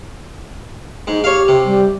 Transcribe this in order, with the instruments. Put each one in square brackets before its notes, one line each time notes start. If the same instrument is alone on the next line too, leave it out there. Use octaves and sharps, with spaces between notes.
[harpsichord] G#2 [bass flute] D#4
[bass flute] G4 [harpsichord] C#5 F5
[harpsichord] C3
[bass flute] G3